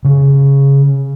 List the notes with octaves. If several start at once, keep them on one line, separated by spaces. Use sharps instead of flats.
C#3